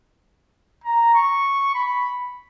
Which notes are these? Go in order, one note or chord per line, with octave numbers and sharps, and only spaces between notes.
A#5
C#6
B5